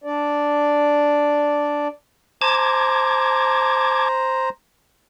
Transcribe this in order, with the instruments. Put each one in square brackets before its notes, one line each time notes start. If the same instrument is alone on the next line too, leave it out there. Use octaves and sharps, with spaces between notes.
[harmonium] D4 D5
[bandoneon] C5 A#5 [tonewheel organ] A5 D6 G#6